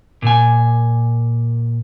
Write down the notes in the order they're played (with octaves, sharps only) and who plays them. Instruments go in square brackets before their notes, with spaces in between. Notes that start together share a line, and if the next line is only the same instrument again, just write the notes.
[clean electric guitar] A#2 G#5